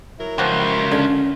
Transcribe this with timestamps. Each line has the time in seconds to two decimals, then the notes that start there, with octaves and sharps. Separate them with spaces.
0.19 F#3 E4 A#4
0.38 C#2 F3 F#4 G4
0.92 D3 C#4